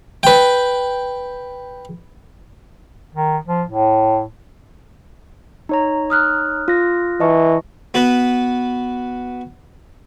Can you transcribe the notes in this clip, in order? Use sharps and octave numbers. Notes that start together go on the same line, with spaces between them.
B4 G5
D#3
F3
A2
D#4 C#5 A#5
D#6 F6 F#6
F4 A#6
E3 D#5 A5 C#6
B3 F#4 B4